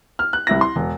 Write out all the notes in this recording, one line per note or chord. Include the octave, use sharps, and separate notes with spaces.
F6
F#6
C2 E4 A#6
C6
E1